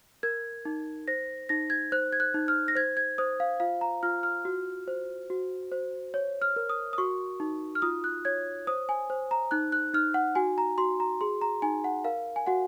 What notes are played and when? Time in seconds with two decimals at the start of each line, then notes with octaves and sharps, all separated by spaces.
0.23 A#4 G#6
0.65 D#4
1.08 C5 A#6
1.49 D#4 A#6
1.70 G#6
1.92 C5 F#6
2.13 G#6
2.20 F#6
2.34 D#4
2.48 F6
2.68 A#6
2.75 C5 G#6
2.97 G#6
3.18 C5 D#6
3.40 F5
3.60 F4 F5
3.81 A#5
4.03 F4 F6
4.23 F6
4.45 F#4
4.88 C5
5.30 F#4
5.72 C5
6.14 C#5
6.42 F6
6.56 A#4
6.69 D#6
6.93 D#6
6.98 F#4 C#6
7.40 D#4
7.75 F6
7.82 F4 D#6
8.04 F#6
8.25 C#5 G#6
8.67 C5 D#6
8.89 G#5
9.10 C5
9.31 A#5
9.51 D#4 F#6
9.72 F#6
9.94 D#4 F6
10.14 F#5
10.35 F#4 G#5
10.58 A#5
10.78 F#4 C6
11.00 A#5
11.21 G#4 C6
11.41 A#5
11.62 D#4 G#5
11.84 F#5
12.04 A#4 F5
12.36 G#5
12.47 F#4 F#5